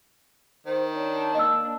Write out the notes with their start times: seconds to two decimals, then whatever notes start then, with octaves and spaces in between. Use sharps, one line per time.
0.66 D#3 C5
0.95 D4 C#5
1.35 A#3 D#5 E6